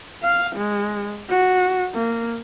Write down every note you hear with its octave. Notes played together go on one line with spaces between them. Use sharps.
F5
G#3
F#4
A#3